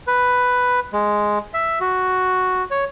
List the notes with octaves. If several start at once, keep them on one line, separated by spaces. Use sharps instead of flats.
B4
G#3
E5
F#4
C#5